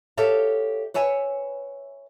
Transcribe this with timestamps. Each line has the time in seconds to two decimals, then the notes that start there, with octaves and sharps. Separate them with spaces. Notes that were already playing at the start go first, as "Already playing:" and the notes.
0.17 G4 A4 C#5 E5 F5
0.94 B4 C#5 E5 G#5